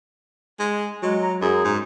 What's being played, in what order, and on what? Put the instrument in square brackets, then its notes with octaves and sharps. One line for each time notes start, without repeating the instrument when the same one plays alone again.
[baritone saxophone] G#3
[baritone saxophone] F#3 [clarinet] G#3
[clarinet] A#5
[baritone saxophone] F#2 [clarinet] G#4
[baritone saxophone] G#2